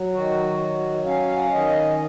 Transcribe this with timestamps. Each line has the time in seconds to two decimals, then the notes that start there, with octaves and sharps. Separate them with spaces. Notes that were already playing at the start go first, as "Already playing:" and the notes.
Already playing: F#3
0.14 D#3 F#4
0.59 F#3
1.05 C#4 F5
1.37 F#5
1.45 F5
1.52 D#3 D#5